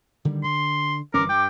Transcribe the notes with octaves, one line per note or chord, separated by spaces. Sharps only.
D3 D#3 G3
D3 C6
G1 E3 C#4 A#4 D6
G2 G5